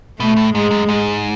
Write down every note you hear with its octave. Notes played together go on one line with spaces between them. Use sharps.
B2 A3
A2
G#2 G#3
F#2
G#2